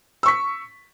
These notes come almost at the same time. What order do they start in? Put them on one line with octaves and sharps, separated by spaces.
E6 C#6 B6